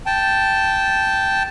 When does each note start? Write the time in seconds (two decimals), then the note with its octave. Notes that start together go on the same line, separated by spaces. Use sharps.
0.06 G5 A5